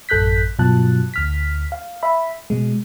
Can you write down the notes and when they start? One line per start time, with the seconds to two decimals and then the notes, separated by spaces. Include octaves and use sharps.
0.09 A1 F#2 A4 F#6 G6 B6
0.59 G2 B2 F#3 F4 A5 F#6
1.14 D2 F6 B6
1.72 F5
2.03 E5 B5
2.50 B2 G#3